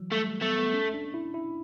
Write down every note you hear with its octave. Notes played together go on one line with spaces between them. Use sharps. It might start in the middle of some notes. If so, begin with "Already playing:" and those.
Already playing: E3 F#3
G3 A3
A3
A3 B3
B3
C#4
D4
E4
E4